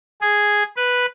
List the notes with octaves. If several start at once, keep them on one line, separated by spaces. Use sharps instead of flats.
G#4
B4